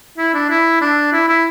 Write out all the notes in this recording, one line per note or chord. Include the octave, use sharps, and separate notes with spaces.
E4
D4
E4
D4
E4
E4